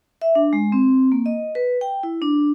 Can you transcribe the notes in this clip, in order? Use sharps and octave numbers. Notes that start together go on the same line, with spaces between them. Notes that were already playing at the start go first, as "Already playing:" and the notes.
E5
D4
G#3
C4
A#3
D#5
B4
G5
E4
D4